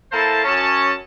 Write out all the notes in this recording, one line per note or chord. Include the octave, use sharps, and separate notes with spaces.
A#3 E4 A4 C5 A5
F#2 C#4 A5